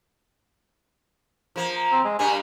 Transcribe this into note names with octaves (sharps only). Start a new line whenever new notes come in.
F3 A#3
C4
G#3
G2 G3 A#3 G#5